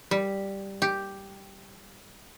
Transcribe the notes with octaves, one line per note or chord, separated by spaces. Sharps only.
G3
G4